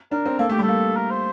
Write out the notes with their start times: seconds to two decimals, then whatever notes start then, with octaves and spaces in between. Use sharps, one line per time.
0.11 D4 A#4
0.26 C4
0.39 A#3 A4
0.49 A3 G4
0.59 G3
0.62 A4
0.68 A#3
0.97 A#4
1.10 C5